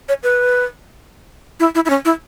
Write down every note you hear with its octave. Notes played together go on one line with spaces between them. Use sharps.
C#5
B4
E4
E4
E4
C#4
E4